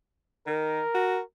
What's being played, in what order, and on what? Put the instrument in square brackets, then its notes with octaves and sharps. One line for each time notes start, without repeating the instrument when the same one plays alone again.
[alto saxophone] D#3 [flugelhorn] A#4
[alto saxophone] F#4